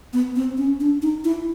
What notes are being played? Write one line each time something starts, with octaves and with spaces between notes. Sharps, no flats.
B3
C4
C#4
D4
D#4
E4